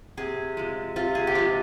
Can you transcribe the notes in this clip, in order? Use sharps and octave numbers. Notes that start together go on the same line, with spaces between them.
C3 G#4
F3 G#3
C3 F4
G#4
G4
F3 G#3 F4